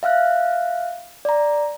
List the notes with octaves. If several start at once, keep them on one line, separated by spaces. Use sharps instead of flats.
E5 F5 F6 F#6
D5 A#5